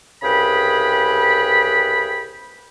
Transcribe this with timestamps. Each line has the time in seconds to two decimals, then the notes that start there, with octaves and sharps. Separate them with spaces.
0.23 C2 C#3 G#4 B4 G5 B5